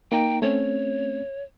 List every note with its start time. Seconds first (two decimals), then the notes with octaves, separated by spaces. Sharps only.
0.12 A#3 D#4 G5 A#5
0.42 A3 C4 C#4 C#5